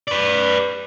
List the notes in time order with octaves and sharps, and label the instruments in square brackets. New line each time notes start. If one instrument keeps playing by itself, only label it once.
[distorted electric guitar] B4 D5